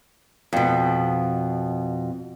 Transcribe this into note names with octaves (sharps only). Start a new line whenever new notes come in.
F2 B2